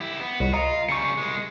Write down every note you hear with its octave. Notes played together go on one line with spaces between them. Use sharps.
E4 G4
B3
C2 F#4
F4 D#5 A#5
C#3 G3 C#6 C#7
C2 G#3